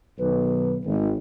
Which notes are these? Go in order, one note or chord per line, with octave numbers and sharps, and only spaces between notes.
B1 D#3 B4
G#1